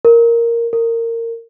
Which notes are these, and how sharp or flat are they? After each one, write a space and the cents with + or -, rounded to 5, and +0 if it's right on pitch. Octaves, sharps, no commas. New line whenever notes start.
A#4 +0
A#4 -20